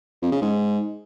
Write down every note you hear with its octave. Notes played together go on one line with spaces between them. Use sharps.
F2
C#3
G#2